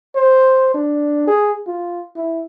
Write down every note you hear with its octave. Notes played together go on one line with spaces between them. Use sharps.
C5
D4
G#4
F4
E4